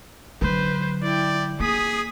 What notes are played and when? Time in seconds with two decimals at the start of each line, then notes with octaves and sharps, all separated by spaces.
0.41 D3 F#3 B4 C5
1.03 E4 D5 G5
1.60 A#3 G#4 D#6 B6